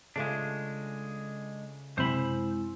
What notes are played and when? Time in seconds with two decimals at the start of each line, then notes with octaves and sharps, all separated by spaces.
0.16 C#3 G#3 A3 D4 F4
1.98 F#2 C3 G#3 C4 E4 C5 B5